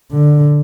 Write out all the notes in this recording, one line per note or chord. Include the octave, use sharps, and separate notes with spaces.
D3